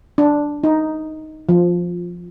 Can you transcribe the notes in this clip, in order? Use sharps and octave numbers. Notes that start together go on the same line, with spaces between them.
D4
D#4
F3